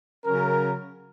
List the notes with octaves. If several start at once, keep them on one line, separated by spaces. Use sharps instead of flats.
C#3 F#3 C#4 A#4